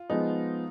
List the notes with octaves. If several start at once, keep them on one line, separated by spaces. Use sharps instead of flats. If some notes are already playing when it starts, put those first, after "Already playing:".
Already playing: F4
F3 G#3 B3 D#4